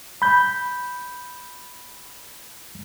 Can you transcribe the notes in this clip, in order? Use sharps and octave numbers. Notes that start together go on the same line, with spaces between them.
B5 G6